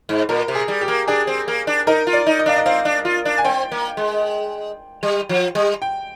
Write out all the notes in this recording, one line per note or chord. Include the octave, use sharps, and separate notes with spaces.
G#2
A#2 A#4
C3
G#4
G3
G4
A#3
D4 G#4
C4
A#3
D4
D#4 A#4
F4
D5
D#4
D#5
D4 F5
D#5
C4 F5
D4
F4
D4
G#5
C4 G5
A#3
G#3
G3
F3
G3
G5